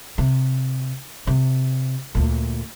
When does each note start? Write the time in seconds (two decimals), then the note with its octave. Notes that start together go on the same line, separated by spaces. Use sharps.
0.18 C3
1.27 C3
2.15 D2 A#2